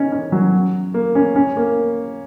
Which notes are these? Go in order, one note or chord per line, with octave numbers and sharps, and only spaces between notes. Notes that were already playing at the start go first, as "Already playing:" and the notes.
Already playing: C#4 D#4
C#4
F#3
A#3
C#4
C#4
A#3